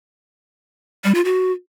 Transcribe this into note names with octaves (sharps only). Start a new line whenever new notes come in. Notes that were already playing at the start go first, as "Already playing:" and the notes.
G3
F4
F#4